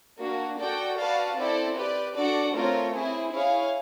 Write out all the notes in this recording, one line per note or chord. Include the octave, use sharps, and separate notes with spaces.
A#3 D4 F#4
F#4 A4 D5 G5
F#4 B4 D5 F5 A5
C4 E4 A4 D5
G4 B4 D5
D4 F#4 A4 D5 F#5
A3 C4 F4 A#4 C#5
C4 E4 G#4
E4 G#4 C#5 F5